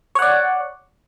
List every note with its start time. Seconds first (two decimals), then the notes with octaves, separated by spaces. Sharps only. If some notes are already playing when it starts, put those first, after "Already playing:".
0.15 C#5
0.19 F#5
0.22 D5